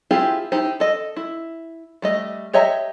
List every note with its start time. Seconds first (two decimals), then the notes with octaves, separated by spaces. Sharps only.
0.11 C4 E4 F4 G4 G#4
0.52 D#4 E4 G4 C5
0.80 A4 D#5
1.16 E4
2.02 G3 A3 D#5
2.53 G4 C#5 D#5 E5 A#5